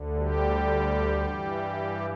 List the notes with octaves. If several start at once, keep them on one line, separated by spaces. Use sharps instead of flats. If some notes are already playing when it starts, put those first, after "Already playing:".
Already playing: D2 D3
G3 G4
G2 E3